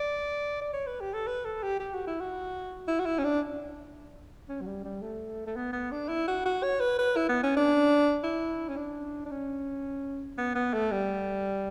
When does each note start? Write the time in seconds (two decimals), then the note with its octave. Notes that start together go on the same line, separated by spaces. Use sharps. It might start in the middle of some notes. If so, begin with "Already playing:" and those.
Already playing: D5
0.61 D5
0.73 C#5
0.87 B4
1.01 G4
1.13 A4
1.27 B4
1.45 A4
1.63 G4
1.80 G4
1.94 F#4
2.07 E4
2.20 F#4
2.88 E4
2.99 F#4
3.06 E4
3.19 C#4
3.24 D4
4.49 C#4
4.61 F#3
4.67 G3
4.84 G3
5.02 A3
5.47 A3
5.56 B3
5.73 B3
5.91 D4
6.08 E4
6.27 F#4
6.45 F#4
6.63 C#5
6.80 B4
6.99 B4
7.16 E4
7.29 B3
7.43 C#4
7.57 D4
8.23 E4
8.68 C#4
8.76 D4
9.26 D4
9.31 C#4
10.38 B3
10.55 B3
10.73 A3
10.91 G3